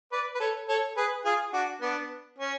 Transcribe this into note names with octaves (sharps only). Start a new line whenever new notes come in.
B4 D5
B4
A4 C#5
A4 C#5
G#4 B4
F4 G#4
D4 F#4
B3 D4
C#4